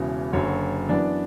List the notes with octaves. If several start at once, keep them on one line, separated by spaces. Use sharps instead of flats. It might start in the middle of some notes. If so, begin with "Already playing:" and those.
Already playing: E1 E2 C#3 E3
F#1 F#2 D3 F#3 C#5
F#2 E3 B3 D4 D5